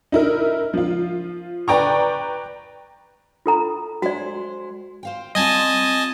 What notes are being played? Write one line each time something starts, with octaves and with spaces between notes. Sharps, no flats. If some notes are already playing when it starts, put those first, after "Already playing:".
D#4 E4 A#4
F3 F4
B4 D5 G5 A#5 C#6
F4 A4 A#5
G#3 F#4 C5 D5
C5 F5 G5
G3 C4 F4 D#5 G#5 A5